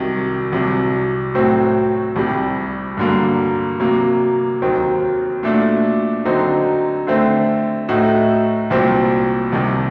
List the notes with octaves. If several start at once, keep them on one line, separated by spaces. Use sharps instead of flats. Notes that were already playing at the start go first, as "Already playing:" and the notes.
Already playing: C2 C3 D#3 F#3
C2 C3 F#3
A2 F#3 C4 F#4
C2 C3 G3
G2 D3 F#3 A#3
C3 F#3 A#3
D#2 D#3 F#3 C4
A#2 A3 D4 F#4
D3 F#3 C4 D#4
D3 A3 C4
A2 A3 D#4 F#4
C2 A#2 F#3 C4
C2 C3 D#3